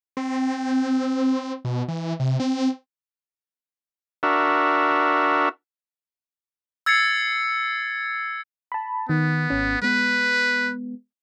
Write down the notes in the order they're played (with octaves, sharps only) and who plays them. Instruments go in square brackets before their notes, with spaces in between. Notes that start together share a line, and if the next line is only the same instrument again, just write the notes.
[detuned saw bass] C4
B2
E3
C3
C4
[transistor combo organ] D4 F#4 A#4 E5
[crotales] E6 G#6 A6 C7 C#7
[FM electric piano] A5 B5
[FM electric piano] D#3 [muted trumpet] B3
[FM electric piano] G#1 C#4
[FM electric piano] G#3 B3 [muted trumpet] B4